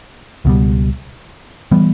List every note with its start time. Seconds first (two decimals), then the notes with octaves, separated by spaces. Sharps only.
0.45 C#2 B2 G3
1.72 E3 G3 B3